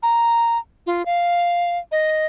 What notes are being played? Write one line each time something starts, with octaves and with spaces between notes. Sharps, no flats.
A#5
F4
F5
D#5